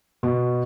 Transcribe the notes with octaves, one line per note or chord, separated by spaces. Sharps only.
B2